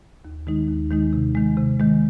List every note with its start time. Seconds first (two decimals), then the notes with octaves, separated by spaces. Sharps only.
0.25 D#2
0.47 D#3 G#3 D#4
0.68 D#2
0.91 D#3 G#3 D#4
1.13 C3
1.35 D#3 G#3
1.57 C3
1.80 D#3 G#3